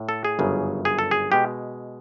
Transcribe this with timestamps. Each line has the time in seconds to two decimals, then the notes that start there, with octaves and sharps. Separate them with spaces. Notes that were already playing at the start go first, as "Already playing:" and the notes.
Already playing: A2
0.09 A4
0.25 G#4
0.39 G1 F#2 C#3
0.85 G#4
0.99 A4
1.11 G#4
1.32 B2 G#3 G4